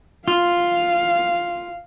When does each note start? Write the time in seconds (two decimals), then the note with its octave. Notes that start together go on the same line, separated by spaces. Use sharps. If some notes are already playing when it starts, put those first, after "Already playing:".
0.28 F4 F5